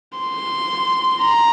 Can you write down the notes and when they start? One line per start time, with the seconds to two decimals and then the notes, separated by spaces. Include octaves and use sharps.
0.18 C6
1.22 A#5